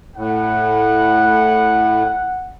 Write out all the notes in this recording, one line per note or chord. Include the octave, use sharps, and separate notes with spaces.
A2 F#5